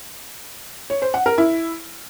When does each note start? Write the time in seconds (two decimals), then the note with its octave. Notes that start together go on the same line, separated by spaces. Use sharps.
0.90 C#5
1.02 C5
1.14 F#5
1.26 A#4
1.38 E4